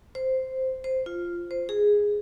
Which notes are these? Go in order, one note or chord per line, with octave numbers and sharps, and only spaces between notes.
C5
C5
F4
C5
G#4